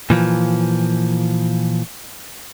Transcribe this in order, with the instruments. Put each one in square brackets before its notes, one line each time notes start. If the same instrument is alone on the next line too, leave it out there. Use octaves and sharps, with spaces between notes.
[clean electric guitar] A#2 E3 F3